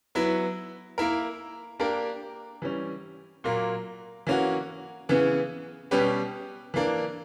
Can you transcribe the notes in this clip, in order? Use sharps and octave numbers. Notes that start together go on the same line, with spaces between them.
F#3 B3 E4
A#3 E4 A#4
A#3 D4 G4 A#4
E3 G3 C#4
A#2 F#3 A#3
E3 A#3 C#4 F#4
C#3 E3 B3
B2 G3 C#4 G4 B4
E3 A#3 D4